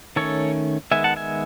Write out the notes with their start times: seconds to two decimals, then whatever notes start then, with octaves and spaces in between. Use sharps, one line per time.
0.16 D#3 A3 C#4 A4 C#5
0.91 D#3 G#3 B3 E5 G#5
1.04 F#5 A5
1.16 E5 G#5